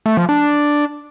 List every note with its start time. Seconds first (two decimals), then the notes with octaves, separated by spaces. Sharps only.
0.06 A3
0.17 F3
0.29 D4